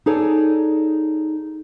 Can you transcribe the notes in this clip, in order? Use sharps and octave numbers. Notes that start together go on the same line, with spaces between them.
D#4 G#4 A4 C#5 D5